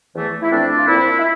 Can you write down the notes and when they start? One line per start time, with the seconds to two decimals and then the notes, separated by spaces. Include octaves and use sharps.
0.15 E2 E3 A3
0.42 E4
0.51 F2 E3 A3 C4 D4
0.77 F4
0.87 A#2 F3 C4 E4
1.19 E4